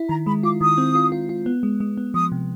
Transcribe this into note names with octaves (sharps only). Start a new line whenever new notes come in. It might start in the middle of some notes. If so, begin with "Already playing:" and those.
Already playing: E4
D#3 A#5
G#3 B5
F4 D6
D#3 D#6
C4
F4
F4
F4
B3
G#3
G#3
B3
F3 D#6
C3